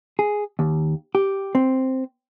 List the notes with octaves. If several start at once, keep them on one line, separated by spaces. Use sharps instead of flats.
G#4
D#2
G4
C4